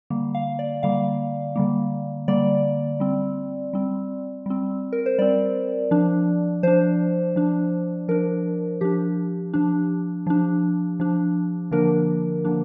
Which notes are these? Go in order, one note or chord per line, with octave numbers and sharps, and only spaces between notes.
D3 G3 A#3
F5
D5
D3 G3 A#3 F5
D3 G3 A#3
D3 G3 A#3 D5
G3 C4
G3 C4
G3 C4
A#4
C5
G3 C4 D5
F3 D4
F3 D4 C5
F3 D4
F3 D4 A#4
F3 D4 G4
F3 D4
F3 D4
F3 D4
D3 F3 A#3 D4 A#4
D3 F3 A#3 D4